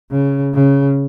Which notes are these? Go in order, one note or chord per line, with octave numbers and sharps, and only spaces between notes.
C#3
C#3